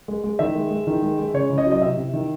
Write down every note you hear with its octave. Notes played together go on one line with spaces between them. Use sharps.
G#3
G#3
D#3 E5
G#3
G#3
D#3
G#3
G#3
C#3 C#5
C#3
D#5
F#3
D#5
C3 E5
C3
D#3